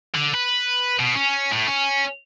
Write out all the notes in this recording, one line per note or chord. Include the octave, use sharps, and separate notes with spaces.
D3
B4
B2
C#4
A2
C#4